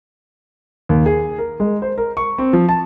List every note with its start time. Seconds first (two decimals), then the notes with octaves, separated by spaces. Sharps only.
0.89 D#2
1.06 G#4
1.38 A#4
1.60 G#3
1.82 C5
1.98 A#4
2.17 C#6
2.38 C4
2.53 F3
2.69 A5